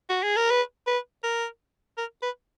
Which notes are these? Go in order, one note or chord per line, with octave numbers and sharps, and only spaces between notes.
F#4
G#4
A#4
B4
B4
A#4
A#4
B4